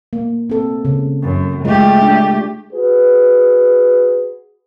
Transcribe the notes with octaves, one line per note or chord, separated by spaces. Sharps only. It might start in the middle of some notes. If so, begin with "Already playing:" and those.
A#3
C4 A4
C#3
F#2
G#3 A3 F4 G4
D4
F#4 G#4 B4